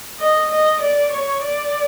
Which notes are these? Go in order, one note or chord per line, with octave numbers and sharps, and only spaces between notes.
D#5
D#5
D5
C#5
D5